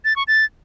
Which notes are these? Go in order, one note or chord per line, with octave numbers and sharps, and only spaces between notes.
A6
C#6
A6